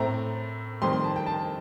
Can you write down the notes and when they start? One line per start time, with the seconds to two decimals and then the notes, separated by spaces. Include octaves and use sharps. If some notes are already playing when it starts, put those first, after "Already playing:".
Already playing: A2 A3 C4 A#5
0.82 F2 D#3 G3 C4 C6
0.92 C6
1.04 A5
1.16 G5
1.26 A5